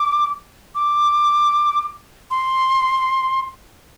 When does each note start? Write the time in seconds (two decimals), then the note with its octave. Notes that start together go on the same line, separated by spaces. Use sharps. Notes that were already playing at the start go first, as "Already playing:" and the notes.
Already playing: D6
0.75 D6
2.30 C6